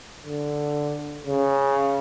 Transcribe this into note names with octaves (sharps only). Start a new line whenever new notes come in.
D3
C#3